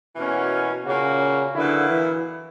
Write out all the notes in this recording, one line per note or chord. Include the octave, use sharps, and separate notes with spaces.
B2 E3 A#3 C#4 F#4
A#2 C#3 A#3 C#4 F#4
A#2 D3 F#3 B3 E4
E3